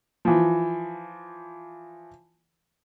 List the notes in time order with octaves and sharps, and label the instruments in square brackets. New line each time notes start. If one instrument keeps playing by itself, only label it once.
[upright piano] E3 F3